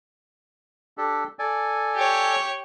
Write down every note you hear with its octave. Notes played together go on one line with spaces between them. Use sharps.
D4 G4 A4
A4 D5 G#5
G4 C#5